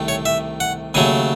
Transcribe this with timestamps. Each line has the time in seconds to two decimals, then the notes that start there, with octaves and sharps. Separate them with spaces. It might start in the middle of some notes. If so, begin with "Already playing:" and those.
Already playing: C2 C3 D#3 A3
0.08 C#5
0.26 E5
0.60 F#5
0.94 D#2 C#3 F#3 A3 G#5